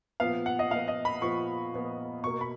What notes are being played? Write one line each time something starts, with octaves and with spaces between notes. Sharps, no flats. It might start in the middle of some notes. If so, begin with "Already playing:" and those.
A#2 F3 B3 F5
F#5
D#5
A#2 F3 B3 F5
D#5
B5
A#2 F3 B3 C#6
A#2 F3 B3
B2 A#3 C#6
B5